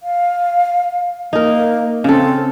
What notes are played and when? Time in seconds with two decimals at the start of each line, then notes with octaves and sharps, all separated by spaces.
0.03 F5
1.33 A#3 D#4 A#4
2.04 C#3 C4 A4